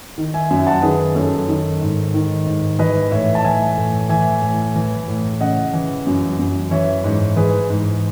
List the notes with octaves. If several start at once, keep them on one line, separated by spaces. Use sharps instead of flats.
D#3
E5 G#5
F#2 E5 G#5
F#5 A5
D#3 G#4 B4
F#2 A4 C#5
D#3
G#2
D#3
G#2
E3 B4 D#5
A2 C#5 E5
A5
E3 E5 G#5
A2
E3 E5 G#5
A2
E3
A2
C#3 D#5 F#5
E3
F#2
F#2
E3 C#5 E5
G#2
E3 G#4 B4
G#2